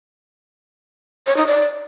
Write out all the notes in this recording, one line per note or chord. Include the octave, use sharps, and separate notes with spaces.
C#5
D#4
D5